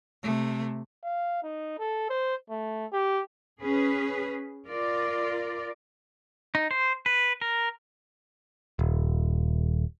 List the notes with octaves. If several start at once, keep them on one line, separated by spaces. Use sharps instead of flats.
C3 A3
F5
D#4
A4
C5
A3
G4
C#4 G#4 B4
F4 A#4 D5
D#4
C5
B4
A#4
D#1